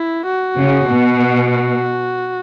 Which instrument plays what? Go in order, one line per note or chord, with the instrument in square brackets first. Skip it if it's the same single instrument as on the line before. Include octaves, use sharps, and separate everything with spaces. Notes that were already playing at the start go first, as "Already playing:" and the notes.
Already playing: [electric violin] E4
F#4
[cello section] C#3
B2
[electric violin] F#4